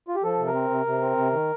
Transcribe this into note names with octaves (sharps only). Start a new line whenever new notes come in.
F4
G4
F3 A4
C3
A#4
C4
C3
C3
C4
C3
D#3